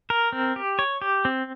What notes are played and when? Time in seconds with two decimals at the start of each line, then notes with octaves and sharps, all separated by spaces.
0.10 A#4
0.33 C4
0.56 G4
0.79 C#5
1.02 G4
1.25 C4